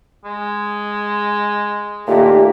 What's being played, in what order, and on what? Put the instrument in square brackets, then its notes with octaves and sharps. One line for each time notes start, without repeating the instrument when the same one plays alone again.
[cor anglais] G#3
[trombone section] A#2 D#3 A3 [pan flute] G4